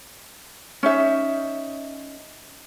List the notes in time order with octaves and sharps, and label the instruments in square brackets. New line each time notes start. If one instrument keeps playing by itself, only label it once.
[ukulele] C#4 D#4 E5